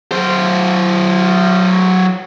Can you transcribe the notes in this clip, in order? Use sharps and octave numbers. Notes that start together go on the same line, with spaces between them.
F#3 C5